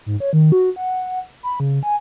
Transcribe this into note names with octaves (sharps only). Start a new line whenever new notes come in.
G#2
C#5
D#3
F#4
F#5
B5
C#3
G#5